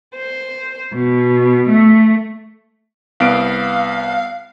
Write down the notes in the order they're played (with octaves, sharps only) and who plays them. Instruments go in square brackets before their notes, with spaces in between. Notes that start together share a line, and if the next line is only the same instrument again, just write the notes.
[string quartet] C5
B2
A3
[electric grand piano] C2 B3 D7 [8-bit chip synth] F5